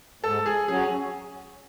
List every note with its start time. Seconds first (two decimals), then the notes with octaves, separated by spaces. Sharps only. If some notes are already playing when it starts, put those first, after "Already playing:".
0.23 G#2 A4
0.46 G#4
0.68 F#3 C#4 G#4